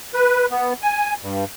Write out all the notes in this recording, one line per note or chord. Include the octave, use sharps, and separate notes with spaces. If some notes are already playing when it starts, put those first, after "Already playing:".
B4
B3
G#5
G2